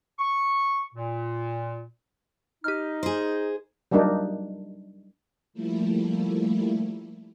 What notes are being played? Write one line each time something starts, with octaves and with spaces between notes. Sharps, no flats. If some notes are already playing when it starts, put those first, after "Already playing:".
C#6
A#2
D#4 G4 F6
G#4 C5
F#3 G3 A#3 D4 D#4
F3 G3 A3 A#3 E4